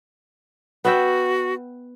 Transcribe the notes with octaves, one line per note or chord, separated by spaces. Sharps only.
B3 F#4 E5 G5